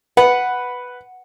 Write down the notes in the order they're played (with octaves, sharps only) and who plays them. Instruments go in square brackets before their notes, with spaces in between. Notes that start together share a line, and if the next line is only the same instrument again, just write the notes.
[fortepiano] B4 [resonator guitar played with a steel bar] F#5